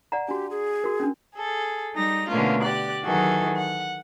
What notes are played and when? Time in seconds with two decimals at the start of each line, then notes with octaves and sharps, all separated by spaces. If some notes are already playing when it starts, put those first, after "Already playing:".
0.12 D5 F#5 A#5
0.29 D4 F#4 G4
0.50 G#4
0.84 F#4 A#4
1.00 C#4 D4
1.34 G#4 A4
1.93 G3 D#4 A#6
2.28 B2 D3 A3 A#3 C#4 F4
2.62 G4 D5 F#6
3.03 D#3 E3 F#3 F#4 G#4 A4
3.56 F#5